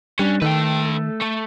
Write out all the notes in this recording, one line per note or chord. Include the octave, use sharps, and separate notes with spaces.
G3 C#4 D4
D#3 A3 A4 B4 G5
A3